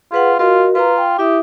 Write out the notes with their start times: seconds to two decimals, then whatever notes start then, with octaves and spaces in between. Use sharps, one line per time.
0.12 F4 G#4 B4 F#5
0.39 F4 F#4 A#4 D#5
0.75 F4 B4 A#5
0.97 G5
1.19 E4 G4 E5 D#6